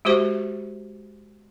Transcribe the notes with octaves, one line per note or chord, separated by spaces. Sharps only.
G#3 F#4 G4 C5 E5